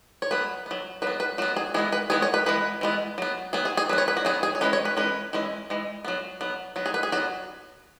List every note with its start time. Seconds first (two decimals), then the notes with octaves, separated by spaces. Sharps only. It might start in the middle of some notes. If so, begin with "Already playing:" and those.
0.22 C#5
0.31 F#3 B3 B4
0.66 F#3 B3
1.02 F#3 B3 B4
1.20 B4
1.38 F#3 F#4
1.42 B3
1.56 G#4
1.74 E3 G#3 B3 G#4
1.92 B4
2.10 E3 G#3 B3 G#4
2.22 C#5
2.34 B4
2.46 E3 G#3 B3 B4
2.81 E3 G#3 B3
3.18 F#3 B3
3.53 F#3 B3 G#4
3.65 G#4
3.77 G#4
3.89 F#3 B3 B4
3.98 C#5
4.08 B4
4.17 F#4
4.25 F#3 B3 G#4
4.43 G#4
4.55 C#5
4.61 E3 G#3 C#4 B4
4.73 C#5
4.85 B4
4.97 E3 G#3 C#4 B4
5.33 E3 G#3 C#4
5.70 E3 G#3
6.05 F#3 B3
6.41 F#3 B3
6.76 F#3 B3
6.86 G#4
6.94 B4
7.03 G#4
7.12 F#3 B3 F#4